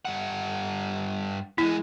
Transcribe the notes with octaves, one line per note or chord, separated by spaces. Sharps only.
G2 F#5
E2 G#3 E4